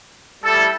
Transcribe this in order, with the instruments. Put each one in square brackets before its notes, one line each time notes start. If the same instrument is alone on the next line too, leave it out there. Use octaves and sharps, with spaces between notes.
[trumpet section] G3 E4 A4